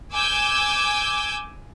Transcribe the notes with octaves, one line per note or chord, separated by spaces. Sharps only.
G#5 D6 E6 G6 G#6